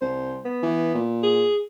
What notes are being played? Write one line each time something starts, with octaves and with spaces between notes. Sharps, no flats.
C2 C5
B3
E3
A#2
G#4